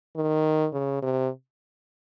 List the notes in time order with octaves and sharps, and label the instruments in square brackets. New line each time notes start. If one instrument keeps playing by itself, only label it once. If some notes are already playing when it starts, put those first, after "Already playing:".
[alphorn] D#3
C#3
C3